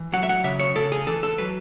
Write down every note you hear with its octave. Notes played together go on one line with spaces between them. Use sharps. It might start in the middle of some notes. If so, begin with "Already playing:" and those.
Already playing: E3
F#3 F#5
E5
F#5
C#3 E5
C#5
C#3 A4
G#4
E3 A4
A4
F#3 B4